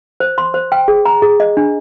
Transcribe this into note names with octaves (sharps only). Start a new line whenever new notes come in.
C5
C6
C5
G5
G#4
A#5
G#4
D#5
D4